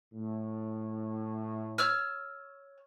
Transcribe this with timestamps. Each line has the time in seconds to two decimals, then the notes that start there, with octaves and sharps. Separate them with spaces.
0.14 A2
1.78 C#5 E6 F6